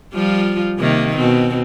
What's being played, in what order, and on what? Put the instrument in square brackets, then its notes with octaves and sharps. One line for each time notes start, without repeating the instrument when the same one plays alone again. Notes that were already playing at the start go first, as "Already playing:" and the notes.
[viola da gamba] F3 G3 F4
C3 D#3 A#3
B2 C4